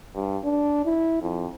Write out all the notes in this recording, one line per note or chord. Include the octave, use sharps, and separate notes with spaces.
G2
D4
E4
F2